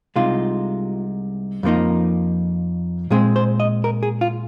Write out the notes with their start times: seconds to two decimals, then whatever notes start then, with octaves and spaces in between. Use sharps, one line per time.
0.16 C2 C3 G#3 D#4 F4
1.63 F2 F3 A#3 D#4
3.10 A#2 G#3 C4 G#4
3.36 C5
3.60 D#5
3.84 A#4
4.03 G#4
4.21 F4